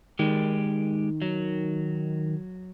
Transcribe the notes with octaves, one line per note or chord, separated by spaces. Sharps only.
D#3 G#3 G4
F#3